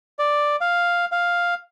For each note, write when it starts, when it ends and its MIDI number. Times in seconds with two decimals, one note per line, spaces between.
0.19 0.56 74
0.61 1.05 77
1.12 1.54 77